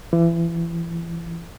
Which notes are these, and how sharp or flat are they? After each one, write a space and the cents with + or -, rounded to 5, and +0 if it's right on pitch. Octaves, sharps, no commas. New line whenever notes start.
E3 +30